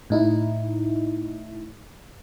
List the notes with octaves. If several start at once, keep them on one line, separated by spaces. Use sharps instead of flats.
A2 D#4 E4